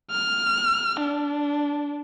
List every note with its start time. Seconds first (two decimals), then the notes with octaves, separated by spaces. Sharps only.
0.11 F6
1.01 D4